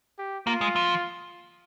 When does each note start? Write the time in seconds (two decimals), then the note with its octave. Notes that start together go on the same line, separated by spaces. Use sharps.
0.18 G4
0.47 A#3 F4
0.61 G#3
0.76 F3